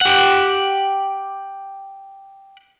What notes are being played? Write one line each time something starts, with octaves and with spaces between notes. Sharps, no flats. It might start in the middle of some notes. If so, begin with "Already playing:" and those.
G4 F#5